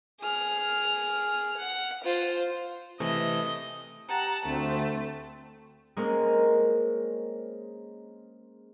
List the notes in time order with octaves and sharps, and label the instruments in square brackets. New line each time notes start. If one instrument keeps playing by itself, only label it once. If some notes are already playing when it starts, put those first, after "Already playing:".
[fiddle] G#4 F6
F#5
F4 C5
[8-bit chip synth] C3 E3 A3 [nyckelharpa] D#5
[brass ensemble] G4 G5 A#5 [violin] F#5 A5
[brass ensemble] D2 [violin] A3 [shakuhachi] C4
[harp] G#3 A#3 C4 C#4